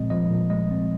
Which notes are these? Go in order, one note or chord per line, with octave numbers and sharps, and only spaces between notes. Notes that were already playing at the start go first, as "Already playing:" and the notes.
Already playing: A#2 F3 G#3 C4 D#5
F3 D#5
A#2
G#3 D#5
C4